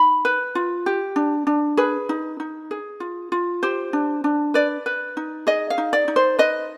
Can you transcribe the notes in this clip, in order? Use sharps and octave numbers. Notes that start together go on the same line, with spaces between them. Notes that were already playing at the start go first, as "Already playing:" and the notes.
Already playing: D#4 B5
B4
F4
G4
D4
D4
G#4 B4
D#4
D#4
G#4
F4
F4
G4 C5
D4
D4
B4 D5
B4
D#4
G#4 D#5
F5
D#4
D5
D#4
C5
B4 D#5